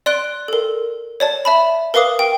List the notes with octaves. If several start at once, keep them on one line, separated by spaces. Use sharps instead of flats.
D5 C6 F#6 D7 G7
A4 A#4
C#5 D5 A5
E5 A5 B5
A#4 B4 F5 D6 D#6
G5